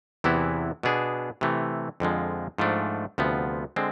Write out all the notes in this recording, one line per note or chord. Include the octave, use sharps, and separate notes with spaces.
E2 C3 E3 B3 E4
B2 B3 D4 G#4
C3 E3 A3
F2 D3 F3 G#3
G#2 F3 A3 D4
D2 C3 F3 B3
D3 G#3 C4